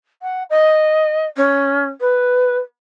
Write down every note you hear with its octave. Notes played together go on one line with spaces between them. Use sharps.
F#5
D#5
C#4
B4